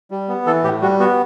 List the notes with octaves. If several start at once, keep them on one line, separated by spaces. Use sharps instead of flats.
G3
B3
E3 A4
A2 G4
G3 F#4
B3 F#4